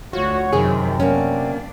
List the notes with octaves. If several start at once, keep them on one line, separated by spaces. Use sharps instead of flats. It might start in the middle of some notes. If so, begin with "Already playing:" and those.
D2 F4 F#4 C#5
F#2 C3 D#3 G#4
A#3 B3 C#4 D4